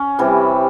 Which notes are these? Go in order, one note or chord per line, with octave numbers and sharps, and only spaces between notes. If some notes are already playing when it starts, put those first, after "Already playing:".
Already playing: C#4
C3 E3 G3